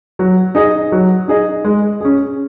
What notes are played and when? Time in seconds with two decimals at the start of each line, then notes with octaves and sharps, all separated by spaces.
0.19 F#3
0.55 D#4 G#4 D#5
0.92 F#3
1.28 D#4 G#4 D#5
1.65 G#3
2.01 C#4 G#4